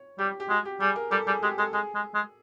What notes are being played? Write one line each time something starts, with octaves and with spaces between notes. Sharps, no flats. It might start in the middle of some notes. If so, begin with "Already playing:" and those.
Already playing: C#5
G3 G4
G4
G#3 F#4
G4
G3 G#4
A#4
G3 A4
G3 G#4
G#3 G4
G#3 A4
G#3 G#4
G#3
G#3